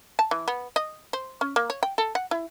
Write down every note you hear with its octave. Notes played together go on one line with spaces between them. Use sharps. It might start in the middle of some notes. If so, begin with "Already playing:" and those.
A5
E3
B3
D#5
C5
C#4
A#3
C#5
G5
A4
F#5
E4